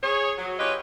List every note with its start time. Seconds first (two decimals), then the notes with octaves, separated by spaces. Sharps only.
0.03 G#4 C#5
0.38 F#3
0.59 C#4 F4 G4 B4 C#5 D#5